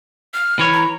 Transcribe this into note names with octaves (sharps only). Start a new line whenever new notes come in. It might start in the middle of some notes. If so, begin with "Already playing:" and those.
F6
E3 C#5
A#5